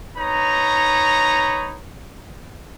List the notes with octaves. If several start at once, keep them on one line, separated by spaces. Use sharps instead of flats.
D#4 B4 C#5 A#5